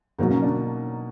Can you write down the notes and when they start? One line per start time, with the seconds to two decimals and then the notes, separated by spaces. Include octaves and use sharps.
0.18 G#2 B2 F#3 G#3 A#3 D#4
0.31 C#3 C#4
0.42 D3 D4